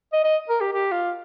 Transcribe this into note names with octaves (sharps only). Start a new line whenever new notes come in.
D#5
D#5
A#4
G4
G4
F4